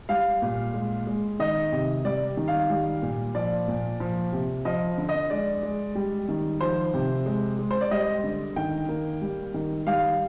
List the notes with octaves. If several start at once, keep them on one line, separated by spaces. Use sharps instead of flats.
G3 F5
A#2
G#3
G#3
D#3 D#5
C3
G3 D5
D#3
F5
G3
A#2
F3 D5
A#2
F3
C3
F3 D#5
D3
D#5
G#3 D5
G#3
G3
D#3
F3 C5
C3
G#3
G#3
C5
D5
G3 D#5
D3
D#3 G5
A#3
G3
D#3
G3 F5